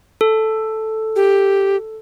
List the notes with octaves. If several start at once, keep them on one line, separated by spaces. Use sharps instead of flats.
A4
G4